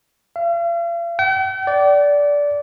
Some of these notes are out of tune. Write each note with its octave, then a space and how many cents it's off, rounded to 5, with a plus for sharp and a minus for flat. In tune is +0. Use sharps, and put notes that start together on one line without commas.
F5 -45
G5 -45
D5 -15